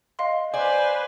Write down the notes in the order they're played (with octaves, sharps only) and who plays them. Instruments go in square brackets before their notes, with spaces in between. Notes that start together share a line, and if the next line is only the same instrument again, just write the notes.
[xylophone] D#5 F5 C6
[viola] B4 C5 [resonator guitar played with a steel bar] D5 [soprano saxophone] G#5